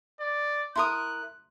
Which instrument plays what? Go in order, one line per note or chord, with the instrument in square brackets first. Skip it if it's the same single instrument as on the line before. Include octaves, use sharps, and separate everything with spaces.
[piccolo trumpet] D5
[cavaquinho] E4 A#4 D#6 [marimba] C6 [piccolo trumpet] F#6